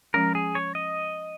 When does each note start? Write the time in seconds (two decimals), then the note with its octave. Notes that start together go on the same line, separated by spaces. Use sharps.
0.14 F3 G#3 C#4 A#4
0.35 G#4
0.55 C#5
0.75 D#5